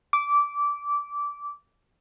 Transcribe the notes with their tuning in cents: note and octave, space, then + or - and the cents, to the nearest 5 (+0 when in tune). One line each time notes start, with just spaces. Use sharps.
D6 -15